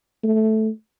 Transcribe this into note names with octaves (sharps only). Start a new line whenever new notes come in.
A3